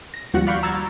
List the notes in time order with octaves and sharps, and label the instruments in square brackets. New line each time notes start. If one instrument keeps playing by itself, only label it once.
[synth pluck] A#6
D#2 F3 G3 F#4 F#5
D5 F5 B5 C#6 G6
A#5 E6 G#6 A6